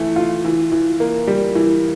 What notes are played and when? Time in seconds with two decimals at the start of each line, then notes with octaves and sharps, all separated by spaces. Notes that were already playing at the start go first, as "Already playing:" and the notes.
Already playing: E3 A3
0.16 F4
0.45 E3
0.72 E3
1.00 A#3
1.27 G3
1.55 E3